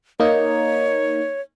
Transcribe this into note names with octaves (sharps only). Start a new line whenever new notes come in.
A#3 D#4 C#5